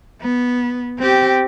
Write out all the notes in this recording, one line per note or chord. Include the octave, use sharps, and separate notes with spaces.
B3
C4 G4